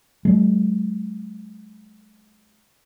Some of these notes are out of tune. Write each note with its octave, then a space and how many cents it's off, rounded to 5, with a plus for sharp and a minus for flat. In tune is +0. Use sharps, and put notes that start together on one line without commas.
F#3 +35 A3 -45